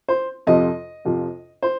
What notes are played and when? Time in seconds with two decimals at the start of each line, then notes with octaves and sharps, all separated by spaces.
0.09 C5
0.47 F2 C3 F3 D#5
1.05 F2 C3 F3
1.62 C5